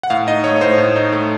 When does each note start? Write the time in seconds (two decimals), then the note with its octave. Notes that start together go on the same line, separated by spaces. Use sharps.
0.03 F#5
0.10 A2 F5
0.27 D#4 D#5
0.44 A3 C#5
0.61 A2 C5
0.78 A2
0.96 D#4
1.12 A3